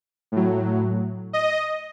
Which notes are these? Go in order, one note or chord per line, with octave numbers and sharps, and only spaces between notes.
A2 F#3
D#5